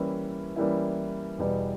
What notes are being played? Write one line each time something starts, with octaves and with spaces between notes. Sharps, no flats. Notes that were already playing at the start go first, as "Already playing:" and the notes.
Already playing: E3 G3 A#3 C#4 E4
E3 G3 A#3 C#4 E4
E2 B2 G3